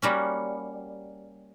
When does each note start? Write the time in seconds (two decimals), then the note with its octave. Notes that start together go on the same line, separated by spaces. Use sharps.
0.02 G3 A#3 C#4 F#4